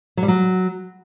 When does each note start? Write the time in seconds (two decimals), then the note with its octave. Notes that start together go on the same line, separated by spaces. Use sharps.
0.17 F#3
0.23 G3
0.28 F#3